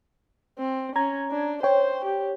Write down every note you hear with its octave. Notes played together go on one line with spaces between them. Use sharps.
C4
C#4 A#5 G#6
D4
C5 C#5 G5
G4